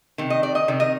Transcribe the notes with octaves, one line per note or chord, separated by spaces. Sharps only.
C3 D#3
D#5
D5
D#5
C3 D#3
D#5